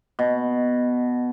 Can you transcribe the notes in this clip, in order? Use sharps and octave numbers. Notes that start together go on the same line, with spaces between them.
B2